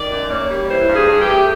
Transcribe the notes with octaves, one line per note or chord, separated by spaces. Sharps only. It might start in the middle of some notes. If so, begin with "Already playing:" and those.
Already playing: D#3 D5
F#2
A#3 C#5
G3
E3 C5
G2
G#4
G2
G4
A3